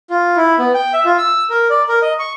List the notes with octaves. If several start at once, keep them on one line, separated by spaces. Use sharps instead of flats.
F4
E4
B3
G5
E5
F4
E6
A#4
D5
A#4
D#5
C#6